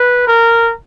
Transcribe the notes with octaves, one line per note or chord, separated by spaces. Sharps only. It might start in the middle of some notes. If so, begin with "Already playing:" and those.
Already playing: B4
A#4